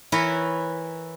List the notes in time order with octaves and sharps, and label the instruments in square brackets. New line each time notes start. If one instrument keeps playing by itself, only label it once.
[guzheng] E3 E4 A#4 B4 C#5